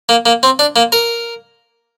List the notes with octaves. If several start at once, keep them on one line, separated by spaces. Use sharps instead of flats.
A#3
A#3
C4
D4
A#3
A#4